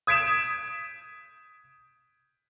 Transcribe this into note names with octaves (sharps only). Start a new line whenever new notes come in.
D#6 G#6 B6 D7 E7